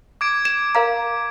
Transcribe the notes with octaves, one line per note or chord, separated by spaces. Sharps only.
D6 G#6 D7
E7
A#4 F5 A#5